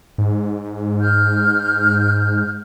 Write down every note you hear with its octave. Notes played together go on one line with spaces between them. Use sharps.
G#2
F6 G6